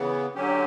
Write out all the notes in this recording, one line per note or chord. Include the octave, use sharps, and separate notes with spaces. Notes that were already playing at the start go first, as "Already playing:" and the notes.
Already playing: C#3 E3 B3
D3 F#3 C#4 G4